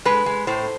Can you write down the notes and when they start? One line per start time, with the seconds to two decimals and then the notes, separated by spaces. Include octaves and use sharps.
0.05 G#3 B4
0.26 G#3
0.47 A2 C5